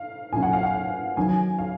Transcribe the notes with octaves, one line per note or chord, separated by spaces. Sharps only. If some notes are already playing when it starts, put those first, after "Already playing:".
Already playing: F5
A#2 F#3 C#4 G#5
F#5
F5
F#5
F#2 D#3 F#3 G#5
F5